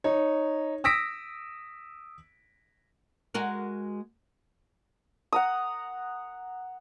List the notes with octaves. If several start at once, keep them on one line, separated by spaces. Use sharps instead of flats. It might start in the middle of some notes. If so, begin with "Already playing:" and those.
D#4 C#5
D#6 E6 A#6 B6 D7
G#3 F#4 A#4
F#5 A#5 D#6